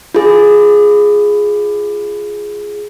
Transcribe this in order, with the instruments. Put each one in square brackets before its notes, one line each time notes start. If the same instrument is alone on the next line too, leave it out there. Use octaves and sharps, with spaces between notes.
[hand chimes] F4 G#4